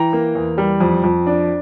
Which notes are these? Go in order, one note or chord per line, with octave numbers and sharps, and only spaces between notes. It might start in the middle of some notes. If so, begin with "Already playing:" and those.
Already playing: E3 G5 A#5
A#3
E2
G3
F2
F2
D4